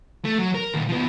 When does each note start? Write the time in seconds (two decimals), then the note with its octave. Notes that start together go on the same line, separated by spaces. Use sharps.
0.25 A3
0.38 F#3
0.54 A#4
0.74 D#2 A#2
0.88 F3 B3